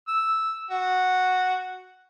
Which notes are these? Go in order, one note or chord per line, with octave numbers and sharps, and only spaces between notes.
E6
F#4